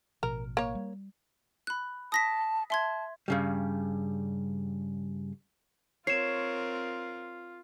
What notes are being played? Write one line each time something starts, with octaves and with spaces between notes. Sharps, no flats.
A1 B2 F3 A#4
A#3 C#5
G3
B5 F#6
A5 D#6 A#6 B6
E5 A5 C6 G#6
G2 C#3 G3
C4 F4 A#4 C#5 C7 E7